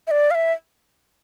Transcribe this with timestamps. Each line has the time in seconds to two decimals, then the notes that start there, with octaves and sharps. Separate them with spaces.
0.07 E5
0.11 D5
0.31 F5
0.35 E5